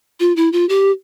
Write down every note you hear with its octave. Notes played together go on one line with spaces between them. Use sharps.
F4
E4
F4
G4